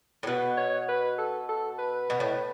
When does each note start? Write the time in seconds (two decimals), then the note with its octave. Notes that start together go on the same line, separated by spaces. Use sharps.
0.23 A2
0.27 B2 B4
0.57 C#5
0.89 B4
1.18 A4
1.49 A4
1.79 B4
2.10 B2
2.20 A2